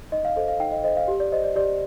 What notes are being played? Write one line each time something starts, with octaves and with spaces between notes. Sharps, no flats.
D#4 D#5
F5
A4 C5 D#5
F5
D#4 G5
D#5
A4 C5 D#5
F5
G4
D5
C5 D#5
D5
G4 D5